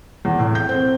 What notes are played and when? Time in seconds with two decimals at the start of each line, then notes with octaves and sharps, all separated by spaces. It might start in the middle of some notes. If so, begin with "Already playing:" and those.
0.25 E2
0.39 A2
0.55 G6
0.69 C4